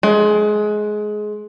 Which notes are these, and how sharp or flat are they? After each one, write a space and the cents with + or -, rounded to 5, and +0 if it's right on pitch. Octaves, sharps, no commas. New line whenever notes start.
G#3 +20